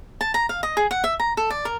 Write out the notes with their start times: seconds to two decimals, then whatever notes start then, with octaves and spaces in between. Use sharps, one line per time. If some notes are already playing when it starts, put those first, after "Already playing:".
0.21 A5
0.34 A#5
0.49 F5
0.63 D#5
0.77 G#4
0.91 F#5
1.04 E5
1.20 A#5
1.37 A4
1.50 D5
1.65 A#4